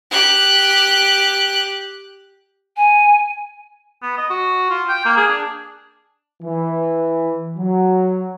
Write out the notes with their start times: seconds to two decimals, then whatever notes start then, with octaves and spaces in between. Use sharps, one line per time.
0.11 G4 F#6
2.76 G#5
4.03 B3
4.18 D#5
4.30 F#4
4.70 F4
4.89 G5
5.05 A#3
5.17 G#4
5.29 D4
6.41 E3
7.57 F#3